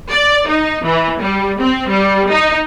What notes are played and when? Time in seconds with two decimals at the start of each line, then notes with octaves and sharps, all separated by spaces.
0.10 D5
0.48 D#4
0.85 E3
1.20 G3
1.61 C4
1.90 G3
2.31 D#4